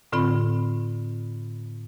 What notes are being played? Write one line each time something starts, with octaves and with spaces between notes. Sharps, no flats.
A2 D3 C4 F4 B5